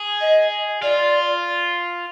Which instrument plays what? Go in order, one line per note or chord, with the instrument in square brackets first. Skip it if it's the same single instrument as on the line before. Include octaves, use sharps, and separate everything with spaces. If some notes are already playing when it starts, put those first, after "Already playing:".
Already playing: [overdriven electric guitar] G#4
[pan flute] D#5
[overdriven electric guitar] F4 [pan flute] D5